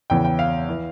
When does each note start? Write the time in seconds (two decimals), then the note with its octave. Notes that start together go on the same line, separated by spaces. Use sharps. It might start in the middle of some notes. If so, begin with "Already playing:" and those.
0.10 E2 C#3 E3 G5
0.25 G5
0.39 F5
0.69 E3